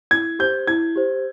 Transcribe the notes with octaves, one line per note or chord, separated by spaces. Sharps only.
E4 G#6
G4 C5 G6
E4 G#6
G4 C5